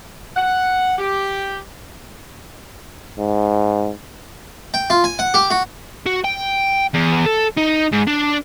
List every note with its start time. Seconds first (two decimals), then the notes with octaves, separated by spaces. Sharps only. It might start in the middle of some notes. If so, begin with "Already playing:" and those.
0.36 F#5
0.99 G4
3.18 G#2
4.74 G5
4.90 F4
5.04 G#5
5.19 F#5
5.34 G4
5.50 F#4
6.07 F#4
6.25 G5
6.94 E2
7.26 A4
7.58 D#4
7.93 G#2
8.08 D4